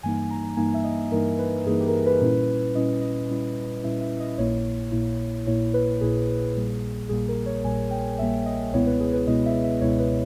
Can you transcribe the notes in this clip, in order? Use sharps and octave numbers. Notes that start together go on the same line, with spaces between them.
G2 E3 G3 A#3 D#4 G#5
A#5
G2 E3 G3 A#3 D#4 G#5
E5
D#5
G2 E3 G3 A#3 D#4 A#4
B4
G2 E3 G3 A#3 D#4 G#4
G4
A#4
G#4
B4
A#2 G3 C#4 E4
A#2 G3 C#4 E4 D#5
D#5
A#2 G3 C#4 E4
A#2 G3 C#4 E4 E5
E5
D#5
A#1 A#2 A#3 E4 C#5
A#1 A#2 A#3 E4
A#1 A#2 A#3 E4 C#5
B4
A#1 A#2 A#3 E4 G#4
A#1 A#2 G3 A#3
A#1 A#2 G3 A#3 G#4
A#4
C#5
A#1 A#2 G3 A#3 G#5
G5
A#1 A#2 G3 A#3 E5
D#5
C#2 B2 G#3 B3 E4 C#5
B4
G#4
B4
C#2 B2 G#3 B3 E4 D#5
E5
E5
C#2 B2 G#3 B3 E4 C#5
B4